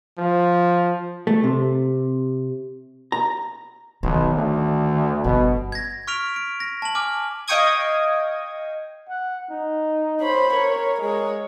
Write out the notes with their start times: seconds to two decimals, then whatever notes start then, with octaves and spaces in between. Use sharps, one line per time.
0.18 F3
1.27 A3
1.43 C3
3.12 A#5
4.03 B1 D#3
4.35 D2
5.24 G1 B2
5.72 G#6 A#6
6.07 C#6 F6 B6 D7 F7
6.36 D7
6.60 A#6
6.82 A5 F#7
6.95 G#5 D6 F6
7.48 D#5 F5 G5 C#6 D#6 G#6
9.09 F#5
9.50 D#4
10.21 C5 C#5 B5
10.53 A#4 C#5
11.01 G#3 C#5